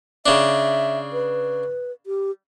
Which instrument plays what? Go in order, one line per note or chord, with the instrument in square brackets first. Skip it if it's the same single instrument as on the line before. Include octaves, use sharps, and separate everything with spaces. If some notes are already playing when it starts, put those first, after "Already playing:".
[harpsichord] C#3 D4 [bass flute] E5
[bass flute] B4
G4